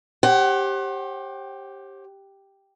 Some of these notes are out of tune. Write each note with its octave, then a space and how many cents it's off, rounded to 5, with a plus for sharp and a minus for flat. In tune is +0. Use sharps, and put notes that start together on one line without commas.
G4 +0 C5 +45 F#5 +25